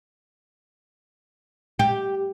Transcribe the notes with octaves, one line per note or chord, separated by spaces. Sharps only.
G4